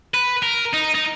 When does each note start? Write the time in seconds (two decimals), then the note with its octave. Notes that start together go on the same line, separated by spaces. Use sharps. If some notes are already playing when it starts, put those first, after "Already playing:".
0.14 B4
0.43 A#4
0.74 D#4
0.95 D#4